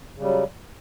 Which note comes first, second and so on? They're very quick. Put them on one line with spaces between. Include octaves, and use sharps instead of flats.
C#3 G3 F#3